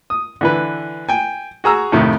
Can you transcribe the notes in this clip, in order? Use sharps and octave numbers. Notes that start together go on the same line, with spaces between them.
D#6
D3 E3 B4
G5 G#5
F#4 G#4 A#5 E6
F2 A2 C3 D#3 A3